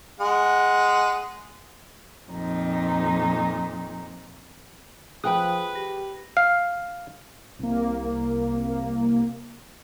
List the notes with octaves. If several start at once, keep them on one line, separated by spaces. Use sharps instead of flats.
G#3 F#5
F2 A#2 D#4
F3 G#4 B4 G5 D#6 F#6
G4 A#6
F5
C2 A#3